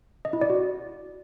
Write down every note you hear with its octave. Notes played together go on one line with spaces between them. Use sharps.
D#5
E4
D5
F#4